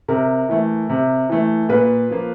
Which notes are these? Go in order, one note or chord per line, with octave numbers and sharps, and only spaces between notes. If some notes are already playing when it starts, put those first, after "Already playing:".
C3 A#4
E3 A3
C3
E3 A3
A#2 B4
F3 A#3